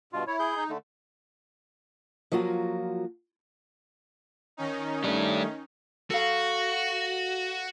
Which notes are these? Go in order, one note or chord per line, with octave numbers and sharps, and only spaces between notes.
G2 B2 F4
E4 C#5
G#4 G6
D#4
D3 A3
F3 F#3 A#3 F4 F#4
D#3 C#4 D#4
G3 A3 D4
F#4 A4 F5